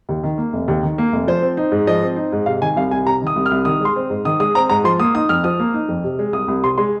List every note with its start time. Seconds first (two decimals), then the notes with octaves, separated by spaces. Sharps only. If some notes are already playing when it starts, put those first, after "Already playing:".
0.09 D#2
0.23 D#3
0.38 A#3
0.53 F1
0.68 D#2
0.83 D#3
0.98 A#3
1.13 F1
1.27 F3 C5
1.42 C4
1.57 D#4
1.72 G#2
1.87 F3 D#5
2.03 C4
2.16 D#4
2.32 G#2
2.46 C3 F5
2.61 D#3 G#5
2.76 C2 F5
2.91 C2 G#5
3.06 C3 A#5
3.21 D#3
3.27 D#6
3.36 C2
3.46 F6
3.51 C2
3.65 D#3 D#6
3.81 G#3 C6
3.96 C4
4.10 G#2
4.25 D#3 D#6
4.40 G#3 D#6
4.55 C4 A#5
4.69 G#2 A#5
4.84 F3 C6
5.00 A#3 D#6
5.14 D#4 D#6
5.29 F2 F6
5.44 F3 D#6
5.59 A#3
5.74 D#4
5.88 F2
6.04 C3
6.19 G#3
6.33 C2 D#6
6.48 C2
6.63 C3 C6
6.78 G#3 C6